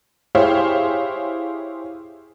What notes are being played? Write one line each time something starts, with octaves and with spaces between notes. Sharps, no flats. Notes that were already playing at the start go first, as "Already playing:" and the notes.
E4 G4 G#4 C5 C#5 F5